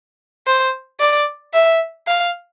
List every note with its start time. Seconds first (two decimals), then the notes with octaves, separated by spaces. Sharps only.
0.47 C5
1.00 D5
1.54 E5
2.07 F5